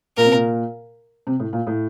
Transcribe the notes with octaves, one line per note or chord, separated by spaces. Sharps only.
A#2 A#4
C3
A#2
C3
A2
A#2
A2